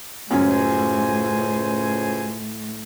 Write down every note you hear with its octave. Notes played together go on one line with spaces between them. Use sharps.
C#2 F#2 A2 C#4 C5 G#5